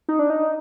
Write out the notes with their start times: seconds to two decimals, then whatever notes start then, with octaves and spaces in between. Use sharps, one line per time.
0.09 D#4
0.19 D4
0.30 D#4